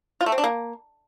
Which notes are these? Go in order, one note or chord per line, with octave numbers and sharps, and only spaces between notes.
F4
A3
C4
D4
A#3